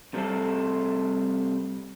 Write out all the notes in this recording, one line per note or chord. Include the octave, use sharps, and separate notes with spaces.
C3 G3 A3 C4 A4